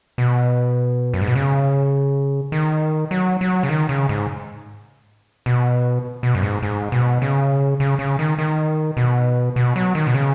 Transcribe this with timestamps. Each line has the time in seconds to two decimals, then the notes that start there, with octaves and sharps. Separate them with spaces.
0.18 B2
1.14 F#2
1.21 G#2
1.27 B2
1.35 C#3
2.52 D#3
3.11 F#3
3.41 F#3
3.63 C#3
3.69 D#3
3.89 C#3
4.09 G#2
5.46 B2
6.23 B2
6.35 F#2
6.43 G#2
6.63 G#2
6.92 B2
7.22 C#3
7.80 C#3
7.99 C#3
8.19 D#3
8.39 D#3
8.97 B2
9.56 B2
9.76 F#3
9.95 D#3
10.07 B2
10.15 C#3